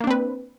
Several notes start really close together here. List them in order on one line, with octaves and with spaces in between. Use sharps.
A#3 D4 C4 B4